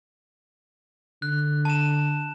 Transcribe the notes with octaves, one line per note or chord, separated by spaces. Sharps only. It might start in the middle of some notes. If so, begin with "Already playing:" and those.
D3 F#6
A5 E7